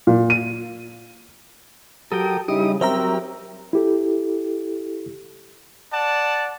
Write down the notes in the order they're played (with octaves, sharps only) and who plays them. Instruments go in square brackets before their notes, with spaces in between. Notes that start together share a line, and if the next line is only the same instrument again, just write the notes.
[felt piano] A#2
D#7
[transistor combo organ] F#3 D#6 [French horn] G4 [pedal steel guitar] A4 A#4 G5
[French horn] C#3 [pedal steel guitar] G3 [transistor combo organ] D#4 E4 D#6 [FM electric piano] G4
[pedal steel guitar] F#3 E6 [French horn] C4 [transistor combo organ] G4 A#4 [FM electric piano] C5 E5 A#5
[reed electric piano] E4 G4 A4
[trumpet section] D5 F#5 A5